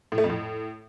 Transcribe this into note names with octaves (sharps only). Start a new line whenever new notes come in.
A2
A3
F2
A2